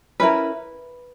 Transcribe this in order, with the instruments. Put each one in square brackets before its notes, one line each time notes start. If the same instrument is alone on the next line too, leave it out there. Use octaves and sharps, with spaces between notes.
[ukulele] C#4 E4 A#4 B4